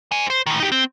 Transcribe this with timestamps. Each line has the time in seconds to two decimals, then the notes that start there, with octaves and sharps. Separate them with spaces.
0.12 C5 G#5
0.30 C5
0.46 A2 D#3
0.60 D#4 G4
0.72 C4